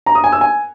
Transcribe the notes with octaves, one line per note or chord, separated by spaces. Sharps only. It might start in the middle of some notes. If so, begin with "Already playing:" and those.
A#5
D#6
G#5
E6
G#5